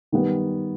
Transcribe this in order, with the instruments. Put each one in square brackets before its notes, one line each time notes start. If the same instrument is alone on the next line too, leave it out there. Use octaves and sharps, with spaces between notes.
[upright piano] D#3 G3 B3